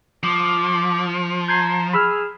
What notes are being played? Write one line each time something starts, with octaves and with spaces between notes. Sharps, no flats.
F3 D6
A#5 G6 G#6 C7
G#4 B5 E6 F6